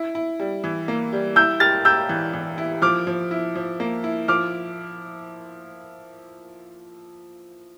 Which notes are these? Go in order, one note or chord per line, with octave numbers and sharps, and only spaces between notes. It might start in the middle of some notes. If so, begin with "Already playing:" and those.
Already playing: E4
E4
G3
E3
A#3
G3
E4 E6 G6
G4 F6 A6
G4 E6 G6
E3
E3
E4
F3 D6 F6
F3
E4
F3
A#3
E4
F3 D6 F6